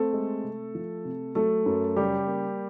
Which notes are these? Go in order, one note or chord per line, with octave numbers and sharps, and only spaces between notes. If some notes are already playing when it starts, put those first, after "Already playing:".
Already playing: A3 C4 A4
G#3
C3
F3
C3
F#3 A3 A4
F#2
C#3 G3 G4
A#3